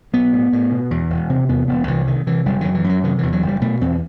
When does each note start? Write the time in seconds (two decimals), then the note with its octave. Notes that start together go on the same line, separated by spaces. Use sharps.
0.13 B1 B3
0.33 A2
0.53 A2
0.72 B2
0.91 E2
1.10 E1
1.29 C3 C4
1.49 E2 B3
1.68 E1 B3
1.87 C2 E3
2.07 C3 D#3
2.27 C3 E3
2.45 F#1 G3
2.61 F#2 D#3
2.74 E3
2.84 F#2
2.89 F#3
3.03 C3 D#3
3.18 E2 E3
3.33 F#3
3.42 F#1
3.48 G3
3.61 B2 A3
3.81 E2 C4